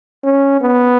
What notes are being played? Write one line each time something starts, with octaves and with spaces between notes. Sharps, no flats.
C#4
B3